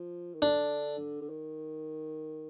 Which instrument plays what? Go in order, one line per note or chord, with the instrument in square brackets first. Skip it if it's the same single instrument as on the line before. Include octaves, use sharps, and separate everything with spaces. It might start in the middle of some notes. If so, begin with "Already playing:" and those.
Already playing: [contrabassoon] F3
D#3
[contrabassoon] D3 [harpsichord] D4
[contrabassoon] D3
D#3